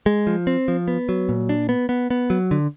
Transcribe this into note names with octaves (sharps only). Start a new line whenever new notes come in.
G#3
F3
C4
F3
B3
F#3
A#2
D4
B3
B3
B3
F#3
D3